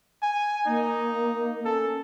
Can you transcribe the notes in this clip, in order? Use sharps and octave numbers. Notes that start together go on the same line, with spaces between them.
G#5
A#3 D#4
C#4 A4